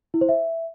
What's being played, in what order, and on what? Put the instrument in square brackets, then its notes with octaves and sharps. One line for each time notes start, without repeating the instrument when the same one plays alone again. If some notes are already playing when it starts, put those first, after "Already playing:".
[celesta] E4
C5
E5